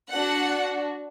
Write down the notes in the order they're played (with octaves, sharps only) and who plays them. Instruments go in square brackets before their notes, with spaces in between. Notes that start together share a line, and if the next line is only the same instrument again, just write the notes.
[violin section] D4 F#4 F#5